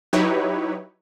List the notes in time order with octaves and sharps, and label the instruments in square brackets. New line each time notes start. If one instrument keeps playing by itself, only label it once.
[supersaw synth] F#3 D#4 E4 G4 B4 C#5